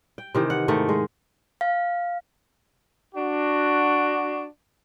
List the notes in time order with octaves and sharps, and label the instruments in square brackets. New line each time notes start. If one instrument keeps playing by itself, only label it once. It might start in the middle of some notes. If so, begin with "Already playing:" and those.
[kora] G5
C3 D#3 E3
F#5
G#2 D#3 A3
G#3
[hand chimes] F5
[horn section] D4 F#4